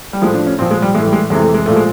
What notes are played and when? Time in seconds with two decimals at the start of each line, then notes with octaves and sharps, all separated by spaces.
0.13 G3
0.22 A2 F3 G#3
0.34 D4
0.47 C#4
0.59 A#2 F3 C4
0.71 G#3
0.82 G3
0.94 A2 E3 G#3
1.06 G3
1.13 G#3
1.30 F2 C3 E3 G#3
1.42 A3
1.54 G#3
1.66 A#2 F3 A3
1.76 G#3